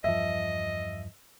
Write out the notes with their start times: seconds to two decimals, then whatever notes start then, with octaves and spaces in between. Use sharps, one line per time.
0.04 E2 G2 F3 D#5 E5